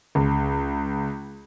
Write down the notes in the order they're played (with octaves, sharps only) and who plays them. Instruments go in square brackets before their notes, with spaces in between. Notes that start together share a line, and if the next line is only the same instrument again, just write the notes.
[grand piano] C#2